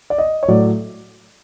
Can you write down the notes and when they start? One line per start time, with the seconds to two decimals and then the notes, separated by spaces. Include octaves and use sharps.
0.10 D5
0.18 D#5
0.43 C#5
0.48 A2 F#3 A3 D5